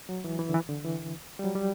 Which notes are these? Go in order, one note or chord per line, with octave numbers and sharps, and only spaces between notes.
F#3
E3
E3
D3
E3
D3
E3
G3
F#3
G3